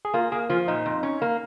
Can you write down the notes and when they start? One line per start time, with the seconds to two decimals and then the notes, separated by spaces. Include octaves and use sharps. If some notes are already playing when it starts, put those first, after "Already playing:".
0.05 G#4
0.14 A#3 F4
0.32 A#3 G#4
0.50 F3 F4
0.68 A#2 D#4
0.86 F2
1.03 C#4
1.22 A#3